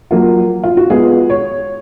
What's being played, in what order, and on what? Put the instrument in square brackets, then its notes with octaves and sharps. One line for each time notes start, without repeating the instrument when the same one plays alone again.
[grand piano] F#3 A#3 F4
[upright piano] F4
F#4
[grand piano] G#3 B3 F4 [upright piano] G#4
[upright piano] C#5